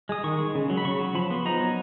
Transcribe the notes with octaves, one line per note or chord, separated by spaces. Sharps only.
G#3 D#6
D#3 C#6
G#3
C#3
F#3
B5
C#3 C#6
F#3
F3 B5
B3
D#4 A#5
F#3